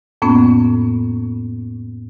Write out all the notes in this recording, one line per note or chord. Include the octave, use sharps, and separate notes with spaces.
F2 A2 A#3 B3 C#4